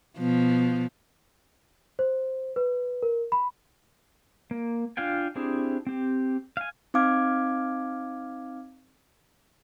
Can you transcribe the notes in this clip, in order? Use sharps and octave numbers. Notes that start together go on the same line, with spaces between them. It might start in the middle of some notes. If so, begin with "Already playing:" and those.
B2 F3 B3
C5
B4
A#4
B5
A#3
D4 F4 F5 G5 G#5
C4 D4 E4 G4 G#4
C4 G4
F5 G#5
C4 D#4 F5 D6 F6 G#6